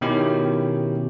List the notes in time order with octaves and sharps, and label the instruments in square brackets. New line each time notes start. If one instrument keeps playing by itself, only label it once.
[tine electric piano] B2 D#3 C#4 E4 G4